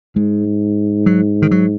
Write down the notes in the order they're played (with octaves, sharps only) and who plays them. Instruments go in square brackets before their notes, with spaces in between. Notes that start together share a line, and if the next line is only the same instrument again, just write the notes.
[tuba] G#2 [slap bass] G#3
[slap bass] F#3
D#3
F#3